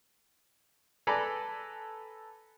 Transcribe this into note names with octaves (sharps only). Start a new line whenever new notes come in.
A4 B4 D5 G#5 A#5 B5